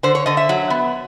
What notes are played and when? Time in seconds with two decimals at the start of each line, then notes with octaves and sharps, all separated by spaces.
0.03 D3 C5
0.15 C#5
0.26 D3 D#5
0.37 E5
0.49 F#3
0.70 B3